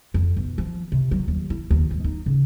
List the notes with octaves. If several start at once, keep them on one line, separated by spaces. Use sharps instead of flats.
F2
B1
F3
C3
F#3
D#2
E4
D#2
G2
D#4
C#3